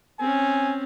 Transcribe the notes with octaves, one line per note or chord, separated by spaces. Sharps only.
C4 C#4 G#5